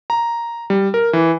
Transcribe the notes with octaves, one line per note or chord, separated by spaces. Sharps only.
A#5
G3
A#4
E3